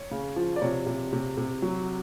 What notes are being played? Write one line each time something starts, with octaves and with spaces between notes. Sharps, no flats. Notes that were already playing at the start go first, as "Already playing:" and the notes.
Already playing: C#5
C#3
F3
D5
C3 C#5
C3
C3
C3
F#3